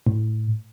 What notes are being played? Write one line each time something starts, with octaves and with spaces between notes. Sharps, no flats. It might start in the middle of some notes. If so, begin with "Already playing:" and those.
A2